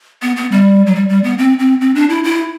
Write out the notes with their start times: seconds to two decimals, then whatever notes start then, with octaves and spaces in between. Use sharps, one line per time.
0.22 B3
0.36 B3
0.52 G3
0.87 F#3
0.95 G3
1.09 G3
1.24 B3
1.38 C4
1.59 C4
1.81 C4
1.95 D4
2.10 E4
2.24 E4